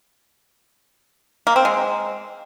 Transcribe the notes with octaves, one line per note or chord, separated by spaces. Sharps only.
A#3
C4
G#3